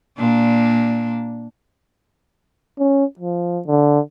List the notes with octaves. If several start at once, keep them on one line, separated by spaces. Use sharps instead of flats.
A#2 A#3 D4
C#4
F3
D3